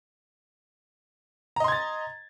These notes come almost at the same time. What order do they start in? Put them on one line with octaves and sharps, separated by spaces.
A#5 D#5 C6 G#6 A6